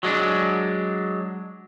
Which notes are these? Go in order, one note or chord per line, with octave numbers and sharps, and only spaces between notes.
F#3 G#3 D4